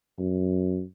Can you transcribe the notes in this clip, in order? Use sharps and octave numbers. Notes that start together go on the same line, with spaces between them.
F#2